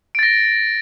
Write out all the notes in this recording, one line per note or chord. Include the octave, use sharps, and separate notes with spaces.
A6 A#6 D7